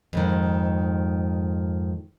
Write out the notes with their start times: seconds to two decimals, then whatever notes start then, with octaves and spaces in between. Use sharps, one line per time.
0.13 F2 G#2 D#3